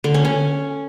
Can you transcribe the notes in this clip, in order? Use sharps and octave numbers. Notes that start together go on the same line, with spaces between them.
D3
C#4
C#4